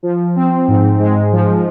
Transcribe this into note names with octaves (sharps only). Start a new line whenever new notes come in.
F3
C4
G#2
G#3
F3